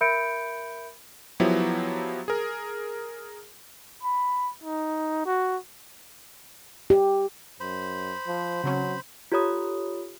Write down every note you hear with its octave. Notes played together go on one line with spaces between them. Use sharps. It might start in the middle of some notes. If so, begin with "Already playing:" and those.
A#4 E5 B5 G6 C#7 D7
F3 F#3 B3 E4 G4
G#4 A#4
B5
D#4
F#4
G4
F#2 C5 B5
F3
C#3 F#3 C4 C#4
F4 G4 A4 C#5 B5 D#6